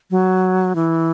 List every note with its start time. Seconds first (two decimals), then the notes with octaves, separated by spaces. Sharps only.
0.11 F#3
0.75 E3